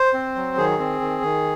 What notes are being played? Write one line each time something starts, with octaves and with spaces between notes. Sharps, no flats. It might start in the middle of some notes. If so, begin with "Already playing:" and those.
Already playing: C5
C4
F#3
D#3 G#4
C4
D#3
D#3